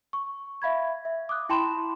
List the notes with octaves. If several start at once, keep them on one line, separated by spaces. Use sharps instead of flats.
C#6
E5 F5 B5 G#6
E5
D6 D#6 F#6
E4 G5 A5 B5 C6 E7